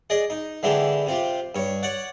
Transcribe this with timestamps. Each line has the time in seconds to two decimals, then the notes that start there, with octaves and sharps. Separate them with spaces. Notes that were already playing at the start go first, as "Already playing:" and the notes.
0.10 G#4 D5 D#5
0.30 D#4
0.63 D3 E3 G#3 D4 G4
1.07 C3 F4 G4
1.55 G2 C#5
1.83 C#5 D5 F#5